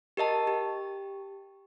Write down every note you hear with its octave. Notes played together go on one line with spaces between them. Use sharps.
G4 A#4 D#5 A5
G4